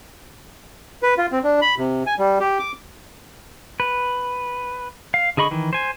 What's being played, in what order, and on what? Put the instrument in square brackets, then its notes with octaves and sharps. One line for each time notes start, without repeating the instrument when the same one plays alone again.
[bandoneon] B4
F4
C4
D4
B5
C3
G#5
G3
G4
D6
[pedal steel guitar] B4
F5
D3 G#4 D#5 B5 C#6
D#3 E3
C5 G#5